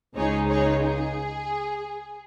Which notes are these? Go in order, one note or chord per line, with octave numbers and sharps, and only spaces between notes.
C#2 C#3 G#3 D#4 G#4 C#5
G#4 C#5
G#4